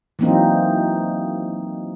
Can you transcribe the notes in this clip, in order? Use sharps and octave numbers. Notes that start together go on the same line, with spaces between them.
E3 F#3 A#3 C4 D#4